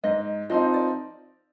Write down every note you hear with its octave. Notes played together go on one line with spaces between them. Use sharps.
G#2 D#5
F3 C4 D#4 D#5
D5